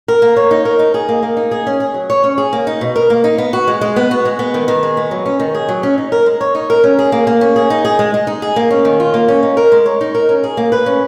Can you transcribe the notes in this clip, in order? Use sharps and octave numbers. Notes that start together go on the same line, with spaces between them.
A#4
A#3
C#5
D#4
A#4
D#4
G#4
A#3
A#3
D#4
G#4
C#4
G#4
F#3
C#5
C#4
G#4
A#3
D#4
B2
A#4
A#3
D#4
B3
F#4
G#3
G#3
B3
F#4
G#3
B3
D#3
D#3
G#3
B3
F#3
C#4
D#3
G#4
F#3
C#4
D#4
A#4
G#3
C#5
D#4
A#4
C#4
G#4
A#3
A#3
C#4
G#4
D#4
G#4
G#3
G#3
D#4
G#4
A#3
C#4
D#3
F4
A#3
C#4
D#4
A#4
G#3
C#5
D#4
A#4
C#4
G#4
A#3
B4
C#4